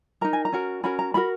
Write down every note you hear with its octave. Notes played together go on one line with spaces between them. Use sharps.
D#4 A#4 A#5
G#5
A#5
C#4 F#4 A#4
C#4 F#4 A#4 B5
A#5
C#4 F#4 A#4 B5